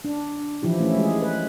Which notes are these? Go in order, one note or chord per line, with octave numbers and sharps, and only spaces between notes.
D4
E3 F3 E4 G4
A3 C#4 E4
G#3 G#4
B4